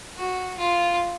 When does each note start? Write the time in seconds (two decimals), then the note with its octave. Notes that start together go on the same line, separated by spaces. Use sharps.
0.16 F#4
0.57 F4